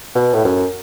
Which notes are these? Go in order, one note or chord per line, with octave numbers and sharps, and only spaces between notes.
B2
A2
F#2